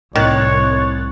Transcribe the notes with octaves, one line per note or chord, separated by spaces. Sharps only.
C2 A2 D#3 C#5 F#6 A6